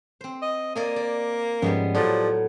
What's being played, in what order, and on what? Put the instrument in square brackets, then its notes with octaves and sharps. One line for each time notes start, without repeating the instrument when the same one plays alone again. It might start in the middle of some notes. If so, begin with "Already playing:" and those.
[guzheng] C4 C5
[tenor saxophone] D#5
[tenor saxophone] A#3 [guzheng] D5 D#5 G#5
[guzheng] D5
[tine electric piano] G#2 F3 C#4 [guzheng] G3 G#3 B3
[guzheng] A2 F#3 [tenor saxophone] F3 [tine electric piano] G4 D5